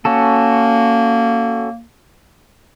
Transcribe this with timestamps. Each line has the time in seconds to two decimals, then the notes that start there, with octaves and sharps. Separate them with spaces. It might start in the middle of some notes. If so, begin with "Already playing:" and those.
0.05 A#3 C#4 F#4 A4